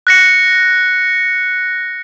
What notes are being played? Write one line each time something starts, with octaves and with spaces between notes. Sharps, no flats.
F#6 A#6 C#7